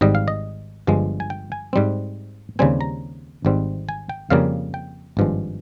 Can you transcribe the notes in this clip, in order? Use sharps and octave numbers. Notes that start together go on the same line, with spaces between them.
G#1 G#2 G3 D#5
F5
D#5
G1 G2 F3 G#3
G#5
G5
G#5
G#2 G3 C4
D#2 C#3 G3 C4 G#5
A#5
G#1 G#2 G3 C4
G#5
G5
F2 C#3 G3 A#3 F5
G5
G#1 G2 F3 G#3